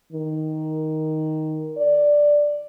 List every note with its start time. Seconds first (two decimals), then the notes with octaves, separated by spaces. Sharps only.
0.13 D#3
1.78 D5